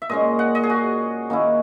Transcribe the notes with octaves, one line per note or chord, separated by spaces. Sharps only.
E5
A#2 G#3 C#4 D#5
F#5
D#5
G#4
F#4
D#3 A#3 C#4 E4